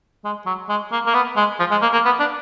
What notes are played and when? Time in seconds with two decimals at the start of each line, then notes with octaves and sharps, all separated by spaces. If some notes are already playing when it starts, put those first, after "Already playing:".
0.24 G#3
0.46 F#3
0.69 G#3
0.92 A#3
1.07 A#3
1.14 B3
1.37 G#3
1.60 F3
1.71 G#3
1.82 A#3
1.93 A#3
2.06 B3
2.20 D4